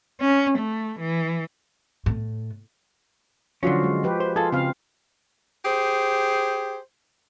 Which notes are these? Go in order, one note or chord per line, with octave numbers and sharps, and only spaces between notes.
C#4
A3
E3
A2
D3 F3 F#3 C#4 F4 F#4
G#3
F3 G4 B4
C5
F4 G#4 A4
C#3 C4 F5
G4 G#4 C5